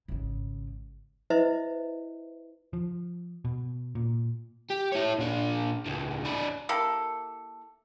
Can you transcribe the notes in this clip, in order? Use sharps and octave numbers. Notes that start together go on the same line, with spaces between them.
G#1 C#3
E4 B4 C5 D#5 E5
F3
B2
A#2
G4
E4 C#5
A#2 D4
C#2 A2
D4 E4
A#3 E4 G4 A4